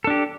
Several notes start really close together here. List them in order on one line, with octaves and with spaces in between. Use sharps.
A4 D4 G4